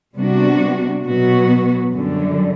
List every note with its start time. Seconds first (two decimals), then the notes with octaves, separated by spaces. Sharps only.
0.16 C3 G3 B3 D4 F#4
1.05 B2 F#3 B3 F#4
1.93 F#2 D3 G3